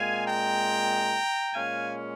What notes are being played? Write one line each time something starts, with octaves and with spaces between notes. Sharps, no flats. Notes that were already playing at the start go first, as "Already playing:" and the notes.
Already playing: A#2 G#3 C4 F5 G#5
G5 A#5
A#2 G#3 C#4 F5 G#5